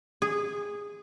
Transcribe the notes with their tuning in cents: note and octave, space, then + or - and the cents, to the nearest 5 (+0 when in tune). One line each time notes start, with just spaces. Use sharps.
G#4 -15